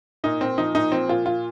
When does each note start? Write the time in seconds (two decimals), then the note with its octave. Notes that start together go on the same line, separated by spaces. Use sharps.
0.24 A#2 D#4
0.41 A#2 C4
0.58 F3 D#4
0.75 A#2 D#4
0.92 F3 C4
1.09 A#2 F4
1.26 F4